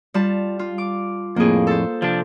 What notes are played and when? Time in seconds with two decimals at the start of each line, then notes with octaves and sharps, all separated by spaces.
0.14 G3 F4 A5
0.59 F4
0.78 D6
1.36 F2 A2 A#3 G#4
1.67 A4 C5
2.02 C3 F3 D4